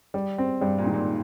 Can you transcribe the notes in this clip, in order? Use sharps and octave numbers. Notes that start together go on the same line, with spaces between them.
G3
C4
G2 G3
A#2
G#2 D#3
A#2